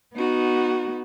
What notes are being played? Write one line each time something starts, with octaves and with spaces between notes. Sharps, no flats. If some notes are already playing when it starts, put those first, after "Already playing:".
B3 D#4 F#4